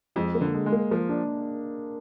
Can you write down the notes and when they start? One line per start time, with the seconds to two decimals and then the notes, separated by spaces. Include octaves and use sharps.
0.16 F2 G#3
0.35 A#3
0.41 D3
0.54 G#3
0.66 G#3
0.72 A#3
0.91 F3 A#3
1.09 D4